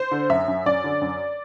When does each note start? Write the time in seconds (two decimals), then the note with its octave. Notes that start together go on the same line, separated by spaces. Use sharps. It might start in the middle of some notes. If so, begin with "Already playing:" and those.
Already playing: C5
0.11 D3
0.30 F#2 E5
0.48 F#2
0.66 F#2 D5
0.84 D3
1.01 F#2